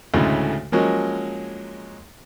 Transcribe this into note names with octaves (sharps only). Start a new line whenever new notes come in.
D2 A2 C#3 G#3 A3
F3 F#3 G#3 A#3 C#4